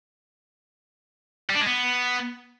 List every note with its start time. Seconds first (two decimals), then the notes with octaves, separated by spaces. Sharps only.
1.50 G3
1.55 D4
1.61 G#3
1.67 B3